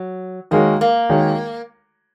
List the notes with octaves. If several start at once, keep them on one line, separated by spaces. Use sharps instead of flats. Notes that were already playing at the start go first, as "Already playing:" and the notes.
Already playing: F#3
D#3 G#3 A#3 F#4 C#5
A#3
D#3 G#3 F#4 C#5